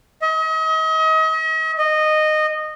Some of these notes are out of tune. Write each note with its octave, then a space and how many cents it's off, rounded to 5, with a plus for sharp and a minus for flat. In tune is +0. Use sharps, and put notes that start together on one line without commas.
D#5 +40
D#5 -15